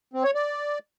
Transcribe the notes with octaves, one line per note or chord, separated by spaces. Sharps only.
C4
C#5
D5